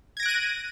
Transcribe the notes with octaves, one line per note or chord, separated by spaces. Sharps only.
F#6 G#6 A#6 D7 D#7